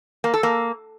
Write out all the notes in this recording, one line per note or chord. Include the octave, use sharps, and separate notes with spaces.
A#3
A4
A#3